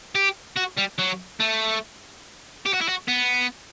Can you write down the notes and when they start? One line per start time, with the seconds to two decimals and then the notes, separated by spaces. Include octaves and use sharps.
0.15 G4
0.57 F#4
0.78 G3
0.99 F#3
1.40 A3
2.66 G4
2.73 F#4
2.81 E4
2.88 F#4
3.08 B3